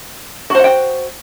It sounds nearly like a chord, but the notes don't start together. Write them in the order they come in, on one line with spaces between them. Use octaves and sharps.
F#4 C5 F#5 G5